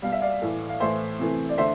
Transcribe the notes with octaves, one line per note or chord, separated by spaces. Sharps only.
B2 G3 F5
E5
D5 F5
A2 E3 A3
F5
A2 E3 A3 C5 E5
C3 E3 A3
D5
D3 A3 C5 E5